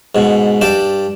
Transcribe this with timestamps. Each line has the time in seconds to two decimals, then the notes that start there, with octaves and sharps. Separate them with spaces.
0.15 G#2 B2
0.61 G2 D5 G5 A5